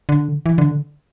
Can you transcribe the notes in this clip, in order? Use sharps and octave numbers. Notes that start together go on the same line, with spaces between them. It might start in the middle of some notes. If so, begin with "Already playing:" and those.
D3
E3
D3